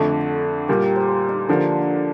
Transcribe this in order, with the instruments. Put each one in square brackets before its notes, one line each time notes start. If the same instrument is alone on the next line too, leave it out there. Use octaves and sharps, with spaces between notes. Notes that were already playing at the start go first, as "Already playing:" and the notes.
Already playing: [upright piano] F2 D3 A3 D4 [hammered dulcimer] A4
[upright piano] A#2 G3 A#3 [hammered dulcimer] G4
[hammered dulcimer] A#4
C5
C5
D#4
[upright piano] D3 F3 A#3 [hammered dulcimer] D4